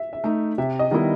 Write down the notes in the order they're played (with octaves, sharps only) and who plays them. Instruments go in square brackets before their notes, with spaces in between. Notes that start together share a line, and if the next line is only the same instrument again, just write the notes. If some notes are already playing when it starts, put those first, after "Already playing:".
Already playing: [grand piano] E5
E5
[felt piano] A3 D#4
[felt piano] C3 [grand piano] E5
[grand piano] D#5
[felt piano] D#3 G3 B3 E4